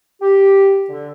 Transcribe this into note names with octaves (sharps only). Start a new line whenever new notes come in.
G4
D3